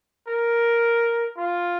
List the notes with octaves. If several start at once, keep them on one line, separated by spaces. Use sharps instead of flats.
A#4
F4